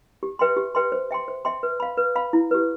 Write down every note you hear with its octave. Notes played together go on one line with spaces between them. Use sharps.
G4
B4 E5 G5 C6
G4
B4 E5 G5 C6
C5
E5 G5 C6
C5
E5 G5 C6
B4
F5 B5
B4
F5 B5
E4
G4 B4